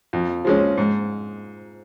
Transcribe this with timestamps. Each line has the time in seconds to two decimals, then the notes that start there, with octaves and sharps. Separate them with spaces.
0.13 F2
0.45 F3 G#3 C#4
0.78 G#2